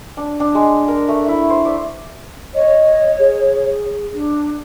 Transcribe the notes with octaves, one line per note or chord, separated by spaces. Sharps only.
D4
D4
G#3
A#4
A3
E4
C5
D5
C#5 D#5
G#4
D4